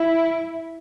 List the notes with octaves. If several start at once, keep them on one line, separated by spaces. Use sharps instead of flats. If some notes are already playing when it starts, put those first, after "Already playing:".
Already playing: E4